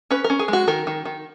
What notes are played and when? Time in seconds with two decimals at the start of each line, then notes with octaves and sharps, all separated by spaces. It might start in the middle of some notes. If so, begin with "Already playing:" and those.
0.11 C#4 B4
0.24 A#4
0.30 C#4
0.39 G#4
0.48 G#3 F#4
0.68 D#3 A#4
0.87 D#3
1.05 D#3